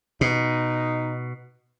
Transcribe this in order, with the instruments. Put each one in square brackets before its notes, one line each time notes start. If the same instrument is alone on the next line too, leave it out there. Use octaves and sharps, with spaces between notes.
[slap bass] B2 [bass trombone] D#4